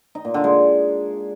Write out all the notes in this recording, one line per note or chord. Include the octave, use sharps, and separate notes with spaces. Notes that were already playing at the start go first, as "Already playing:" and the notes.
D#4
A#2
D3
G#3